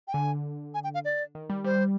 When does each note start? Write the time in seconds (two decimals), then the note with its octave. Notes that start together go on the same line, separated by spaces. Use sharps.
0.08 G5
0.13 D3 G#5
0.74 G#5
0.84 G5
0.94 F5
1.05 D5
1.35 D#3
1.50 G3
1.64 G3 C5